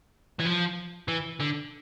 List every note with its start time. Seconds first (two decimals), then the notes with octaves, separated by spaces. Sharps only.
0.39 E3
0.45 F3
1.08 E3
1.40 D3